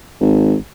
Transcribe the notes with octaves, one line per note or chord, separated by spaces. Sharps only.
G#1